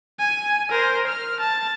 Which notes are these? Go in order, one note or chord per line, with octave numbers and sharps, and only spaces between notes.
G#5
A#4 C5
F6
A5